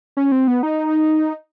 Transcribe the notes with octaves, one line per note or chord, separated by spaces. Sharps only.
C#4
C4
B3
D#4